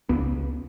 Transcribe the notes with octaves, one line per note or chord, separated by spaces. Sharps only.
C#2 B3